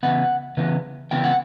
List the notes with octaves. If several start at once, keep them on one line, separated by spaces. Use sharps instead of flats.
C#3 E3 B3 F#5
C#3 E3 B3
C#3 E3 B3 G5
F#5